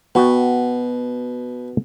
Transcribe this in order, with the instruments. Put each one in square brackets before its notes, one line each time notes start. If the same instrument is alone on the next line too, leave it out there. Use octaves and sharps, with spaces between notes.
[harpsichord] B2 [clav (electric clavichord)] B3 F#4 G5